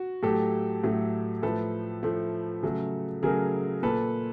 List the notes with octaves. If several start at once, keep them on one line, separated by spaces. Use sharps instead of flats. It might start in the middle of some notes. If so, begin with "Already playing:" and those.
Already playing: F#4
A2 F#3 A3 G4 A4
A2 F#3 A3
A2 F3 A3 A4 B4
A2 F3 A3
C#3 F#3 A3
C#3 F#3 A3 G#4 A#4
A#2 A4 B4